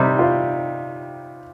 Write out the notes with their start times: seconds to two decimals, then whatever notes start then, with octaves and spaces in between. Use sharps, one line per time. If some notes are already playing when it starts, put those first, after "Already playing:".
Already playing: C3 G3 D#4
0.19 F4